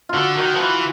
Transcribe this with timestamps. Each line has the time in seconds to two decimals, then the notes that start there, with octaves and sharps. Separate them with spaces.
0.09 F4
0.14 D3 F#4
0.37 D#3 F#4
0.55 F3
0.60 E3 F4